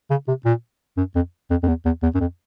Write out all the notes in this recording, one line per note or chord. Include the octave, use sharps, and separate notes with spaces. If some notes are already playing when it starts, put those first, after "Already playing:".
C#3
C3
A#2
F#2
F2
F2
F2
E2
E2
E2
F#2
F2